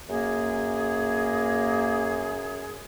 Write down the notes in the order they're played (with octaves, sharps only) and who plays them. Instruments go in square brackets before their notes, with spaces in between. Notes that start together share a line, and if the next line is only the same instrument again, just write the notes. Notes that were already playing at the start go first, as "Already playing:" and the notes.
[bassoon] F#2 [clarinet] A#3 [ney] G#4